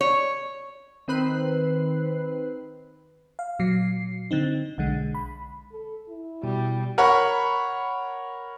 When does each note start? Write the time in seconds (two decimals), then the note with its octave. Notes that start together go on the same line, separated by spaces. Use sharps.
0.01 C#5
1.08 D#3 C4 B4 F#6 C7
3.39 F5
3.59 A#2 F#3 C7
4.31 D3 C4 D#4
4.78 B1 D3 G#3
5.15 B5
5.72 A4
6.09 E4
6.44 B2 G3
6.98 A#4 C#5 F#5 B5 C#6